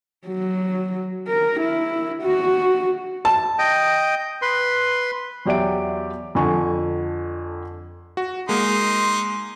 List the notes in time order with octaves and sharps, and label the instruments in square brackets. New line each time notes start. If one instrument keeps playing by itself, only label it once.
[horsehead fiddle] F#3
A#4
E4
F#4
[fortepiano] A5
[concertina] D#5 G5
B4 C6
[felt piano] E2 F#3 G4 D5 E5 D7
F2 D3 G#5 C#6
[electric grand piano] F#4
[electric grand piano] G#3 A#3 [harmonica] D#4 C6